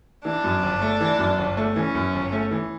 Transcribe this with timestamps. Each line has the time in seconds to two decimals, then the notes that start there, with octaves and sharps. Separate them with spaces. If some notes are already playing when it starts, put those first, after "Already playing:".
0.25 E3 D4
0.44 F#2
0.63 G1
0.81 A3
1.01 E3
1.19 F#2
1.38 G1
1.57 A3
1.75 E3 C#4
1.95 F#2
2.13 G1
2.32 A3
2.51 E3